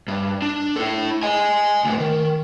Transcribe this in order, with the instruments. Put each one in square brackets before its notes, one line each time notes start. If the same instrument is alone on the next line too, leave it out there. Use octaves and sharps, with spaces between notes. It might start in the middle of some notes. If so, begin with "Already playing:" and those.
[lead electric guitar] G2
D4
E4 A4
D#5 G#5
D2 A2
D#3